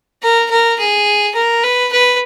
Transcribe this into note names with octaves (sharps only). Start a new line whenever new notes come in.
A#4
A#4
G#4
A#4
B4
B4